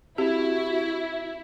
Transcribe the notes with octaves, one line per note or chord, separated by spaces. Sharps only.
C4 E4 F#4 G4